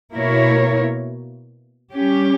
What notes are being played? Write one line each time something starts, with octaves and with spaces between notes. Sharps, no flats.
B2 A#3 E4 A#4 C#5
G3 C#4 G4